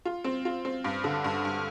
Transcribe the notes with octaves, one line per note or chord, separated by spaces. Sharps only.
F4
C4
F4
C4
G2
D3
G2
G2